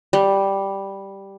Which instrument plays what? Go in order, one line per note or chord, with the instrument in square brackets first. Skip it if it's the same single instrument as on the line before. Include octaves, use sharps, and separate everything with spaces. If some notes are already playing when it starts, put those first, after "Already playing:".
[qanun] G3